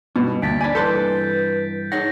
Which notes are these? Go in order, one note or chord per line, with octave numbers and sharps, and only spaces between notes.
G2 B2
D2 A#3 A6 B6 D7
D4 D5 G#5 B5
G2 E3 A4 B4 C6 F#6 G6
D#4 G#4 C#5 F#5 A#6